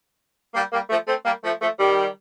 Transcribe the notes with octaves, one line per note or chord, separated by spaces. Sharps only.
G3 A#3
G3 A#3
F3 A3
A3 C4
G3 A#3
F3 A3
F3 A3
D#3 G3